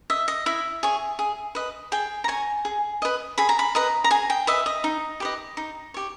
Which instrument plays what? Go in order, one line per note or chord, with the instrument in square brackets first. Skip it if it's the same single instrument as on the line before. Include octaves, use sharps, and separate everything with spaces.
[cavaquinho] D#5 E5
D#5
E4 E5
G#4 C#5
G#4
B4 D#5
G#4 G5
A#5
C#5 G#5
G#4
B4 D#5
G#4 B5
A#5
B5
B4 D#5 A#5
A#5
G#4 G#5
G5
B4 D#5 E5
D#5
D#4
G4 B4 D#5
D#4
G4 C#5